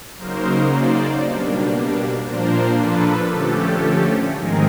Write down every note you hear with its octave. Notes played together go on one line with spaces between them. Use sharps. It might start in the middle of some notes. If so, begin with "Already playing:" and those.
C#3 F#3 A#3 D#4 A#4 C5
C5 D5
B2 G3 A#3 D4
A#2 F3 A#3 D4 A#4 C5
A4 B4
D3 F3 A3 C#4 G4 A4
G#2 D#3 G#3 C4 G#4 A#4